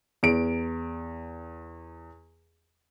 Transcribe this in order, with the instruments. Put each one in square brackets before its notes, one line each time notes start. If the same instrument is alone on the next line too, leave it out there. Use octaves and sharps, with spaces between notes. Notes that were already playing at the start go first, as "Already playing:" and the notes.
[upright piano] E2 D7